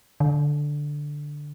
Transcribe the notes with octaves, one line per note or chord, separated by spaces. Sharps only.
D3